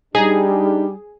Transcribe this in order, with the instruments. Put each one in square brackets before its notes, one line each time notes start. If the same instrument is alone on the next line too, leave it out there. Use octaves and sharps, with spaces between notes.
[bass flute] G3 [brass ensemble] D4 G4 [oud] D#4 [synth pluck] G#4